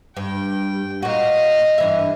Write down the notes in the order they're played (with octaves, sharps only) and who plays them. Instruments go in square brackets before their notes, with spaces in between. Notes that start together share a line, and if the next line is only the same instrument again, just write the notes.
[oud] G2 [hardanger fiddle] G5
[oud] A#2 F#4 [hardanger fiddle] D#5 F5
[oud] G2 E3 E5